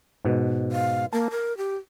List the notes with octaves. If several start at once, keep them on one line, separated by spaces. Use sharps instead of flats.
G#2 B2
F5
A#3 A5
A#4
G4